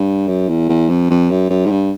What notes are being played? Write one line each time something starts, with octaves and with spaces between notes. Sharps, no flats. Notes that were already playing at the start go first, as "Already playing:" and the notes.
Already playing: G2
F#2
E2
E2
F2
F2
F#2
F#2
G#2
G2